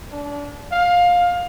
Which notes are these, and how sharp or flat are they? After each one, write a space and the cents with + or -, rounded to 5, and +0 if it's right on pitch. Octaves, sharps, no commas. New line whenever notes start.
D4 -30
F5 +20